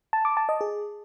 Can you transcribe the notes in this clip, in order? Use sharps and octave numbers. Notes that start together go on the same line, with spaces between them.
A5
D6
A5
D#5
G#4